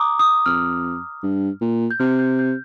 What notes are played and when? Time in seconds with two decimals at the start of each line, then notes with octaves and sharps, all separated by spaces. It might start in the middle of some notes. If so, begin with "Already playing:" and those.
Already playing: A#5 D6 D#6
0.19 D#6
0.46 F2 F6
1.23 G2
1.61 A#2
1.91 G6
1.99 C3 F6
2.19 G6
2.39 G6